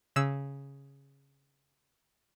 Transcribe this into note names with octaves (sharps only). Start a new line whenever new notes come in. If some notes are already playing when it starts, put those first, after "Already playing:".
C#3 E6